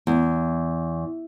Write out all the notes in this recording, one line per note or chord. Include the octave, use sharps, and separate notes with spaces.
E2